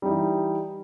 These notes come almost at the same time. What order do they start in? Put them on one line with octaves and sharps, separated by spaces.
G3 D#4 E3